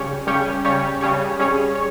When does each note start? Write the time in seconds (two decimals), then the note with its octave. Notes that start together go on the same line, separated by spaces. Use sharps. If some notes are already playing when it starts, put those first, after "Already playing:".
Already playing: C#3 G3 C#4 G4 C#5
0.27 C#3 G3 C#4 G4 C#5
0.65 C#3 G3 C#4 G4 C#5
1.01 C#3 G3 C#4 G4 C#5
1.39 G3 C#4 G#4 C#5
1.75 C#5